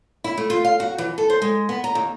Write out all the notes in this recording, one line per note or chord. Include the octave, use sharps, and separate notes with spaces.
E4
A3
F4
F5
F#4
E3
A4
C5
G#3
B3
A#5
D#2